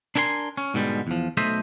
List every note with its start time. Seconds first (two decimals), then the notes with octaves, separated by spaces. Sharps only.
0.16 D4 E4 A#4 G#5 C6
0.57 C#4
0.74 G#2 B2 D3 G3 G#3
1.07 E2 F3
1.37 B1 A3 C5 D#5 E5